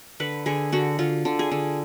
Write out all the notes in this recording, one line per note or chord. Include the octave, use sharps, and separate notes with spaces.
D3 B4
D3 G#4
D3 F#4
D3 F4
D3
G#4
D3